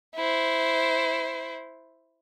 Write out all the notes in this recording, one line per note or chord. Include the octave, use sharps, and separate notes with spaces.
E4 C5